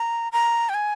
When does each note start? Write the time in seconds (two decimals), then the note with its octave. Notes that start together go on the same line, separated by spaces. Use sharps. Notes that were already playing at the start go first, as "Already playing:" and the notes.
Already playing: A#5
0.32 A#5
0.69 G5
0.74 G#5